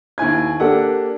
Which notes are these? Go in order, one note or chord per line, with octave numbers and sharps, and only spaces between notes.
D#2 E4 G#5 G#6
A#3 D4 G4 A4 F#5